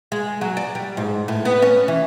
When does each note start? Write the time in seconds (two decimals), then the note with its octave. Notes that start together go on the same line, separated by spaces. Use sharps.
0.12 G#3
0.41 F#3
0.57 D5
0.75 G3
0.97 G#2
1.28 A2
1.45 B3
1.62 C#4
1.88 E3